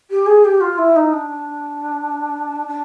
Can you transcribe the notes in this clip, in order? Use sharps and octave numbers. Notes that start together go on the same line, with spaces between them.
G4
G#4
G4
F4
E4
D#4
D4
D4